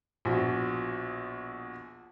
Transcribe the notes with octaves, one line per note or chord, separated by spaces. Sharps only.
A#1 B2